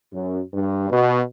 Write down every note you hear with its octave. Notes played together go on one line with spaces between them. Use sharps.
F#2
G2
B2